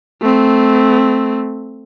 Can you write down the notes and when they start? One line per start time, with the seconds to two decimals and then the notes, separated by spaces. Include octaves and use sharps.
0.21 A3 C4